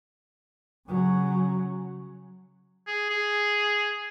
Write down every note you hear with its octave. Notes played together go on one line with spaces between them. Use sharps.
C#3 F#3
G#4
G#4